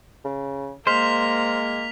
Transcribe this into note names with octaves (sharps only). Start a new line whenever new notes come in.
C#3
G#3 A#3 C5 F6 B6 F7